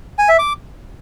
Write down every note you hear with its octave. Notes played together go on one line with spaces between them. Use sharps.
G#5
E5
D6